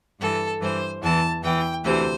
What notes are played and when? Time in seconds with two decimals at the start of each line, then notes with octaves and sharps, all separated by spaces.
0.19 G2 E3 A4
0.60 G2 E3 C5
1.02 E2 E3 A5
1.43 E2 E3 G5
1.84 D2 C3 E3 C5